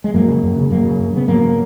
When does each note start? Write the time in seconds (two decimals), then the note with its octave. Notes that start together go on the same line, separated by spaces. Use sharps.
0.04 G#3
0.14 F#2 F#3 A#3
0.28 C#3
0.43 F#2
0.57 C#3
0.70 F#2 F#3 A#3
0.85 C#3
0.99 F#2
1.13 C#3 B3
1.27 G#2 F#3 A#3